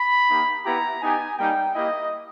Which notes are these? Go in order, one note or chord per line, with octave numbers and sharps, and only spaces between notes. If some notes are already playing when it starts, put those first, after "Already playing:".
Already playing: B5
A#3 D#4 G4
B3 E4 G4 A#5
B3 D#4 G4 G#5
G3 A#3 D#4 G5
A#3 E4 G4 D#5